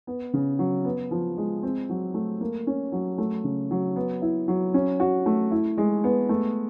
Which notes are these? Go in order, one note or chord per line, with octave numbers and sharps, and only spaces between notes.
B3
C#3
F#3
B3
F3
G#3
C4
F#3
A3
A#3
C#4
F#3
A3
C#3
F#3
B3
E4
F#3
C#4
F#4
A3
E4
G#3
B3
A3